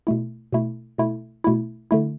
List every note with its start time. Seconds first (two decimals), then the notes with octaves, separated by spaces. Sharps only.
0.07 B2 A3 E4
0.52 B2 A3 E4
0.98 B2 A3 E4
1.44 B2 A3 E4
1.91 D3 A3 E4